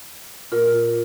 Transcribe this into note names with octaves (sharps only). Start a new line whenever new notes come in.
A#2 A#3 F4 A#4